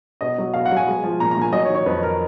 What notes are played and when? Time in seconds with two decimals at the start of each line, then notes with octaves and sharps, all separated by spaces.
0.21 B2 D#5
0.38 F#3
0.54 B2 F5
0.66 F#5
0.71 F#3
0.76 G#5
0.87 G#3
1.04 F3
1.20 A#2 A#5
1.31 A#5
1.37 A#2 G#5
1.52 F#3 D#5
1.65 C#5
1.69 D#3
1.75 C#5
1.86 F2 B4
2.03 A#4